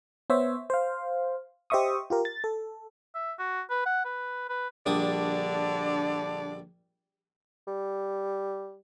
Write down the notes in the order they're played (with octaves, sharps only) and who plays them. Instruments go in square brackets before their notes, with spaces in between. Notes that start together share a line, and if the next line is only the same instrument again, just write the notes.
[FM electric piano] B3 C5 C#5 E5
C5 F5
G4 C5 D#5 E5 C#6 D#6
F4 G4 A#4
A6
A4
[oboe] E5
F#4
B4
F#5
B4
B4
[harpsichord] A#1 G3 D#6 [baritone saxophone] D3 [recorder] D4 [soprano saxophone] D5
[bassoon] G3